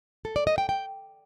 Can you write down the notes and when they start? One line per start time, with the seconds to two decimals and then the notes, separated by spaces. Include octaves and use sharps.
0.25 A4
0.36 D5
0.47 D#5
0.58 G5
0.69 G5